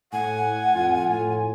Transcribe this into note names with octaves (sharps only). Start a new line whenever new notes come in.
A2 F#5 G#5
F2 F4
A2